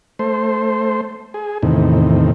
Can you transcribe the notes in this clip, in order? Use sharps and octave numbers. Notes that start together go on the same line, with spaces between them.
A3 C5
G#4
E2 A2 C3 D#3